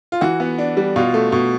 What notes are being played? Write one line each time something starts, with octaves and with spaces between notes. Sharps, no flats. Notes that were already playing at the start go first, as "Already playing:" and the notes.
F4
E3 F#4
B3
D4
G3
B2 F4
A3
B2